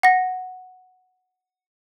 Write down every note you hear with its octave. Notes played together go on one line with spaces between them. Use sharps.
F#5 A#6